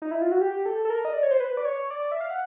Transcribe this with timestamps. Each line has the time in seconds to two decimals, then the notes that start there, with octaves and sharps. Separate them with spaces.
0.02 D#4
0.11 E4
0.22 F4
0.31 F#4
0.41 G4
0.66 A4
0.85 A4
0.90 A#4
1.05 D#5
1.13 D5
1.23 C#5
1.31 C5
1.40 B4
1.57 D5
1.65 C#5
1.90 D5
2.11 E5
2.21 F5
2.30 F#5